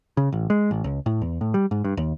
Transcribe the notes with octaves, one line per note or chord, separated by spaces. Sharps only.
C#3
A1
G#3
A1
C#2
A2
E2
A2
G3
G#2
G2
D#2